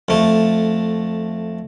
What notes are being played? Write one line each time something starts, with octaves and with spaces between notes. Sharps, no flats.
F2 A3